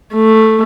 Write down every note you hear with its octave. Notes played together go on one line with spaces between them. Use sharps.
A3